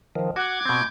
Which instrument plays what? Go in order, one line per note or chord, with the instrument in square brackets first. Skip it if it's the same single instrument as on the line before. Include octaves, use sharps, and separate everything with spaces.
[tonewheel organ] D#3 F3
[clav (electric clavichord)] F#4 [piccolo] F#5 [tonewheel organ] D6 G#6
[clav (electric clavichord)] B2 C4 [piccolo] G6